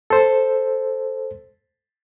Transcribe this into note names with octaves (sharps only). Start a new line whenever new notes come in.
A4 C5